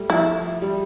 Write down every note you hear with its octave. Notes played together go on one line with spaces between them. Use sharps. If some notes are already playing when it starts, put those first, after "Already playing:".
Already playing: G3 A3
F3 E4
G3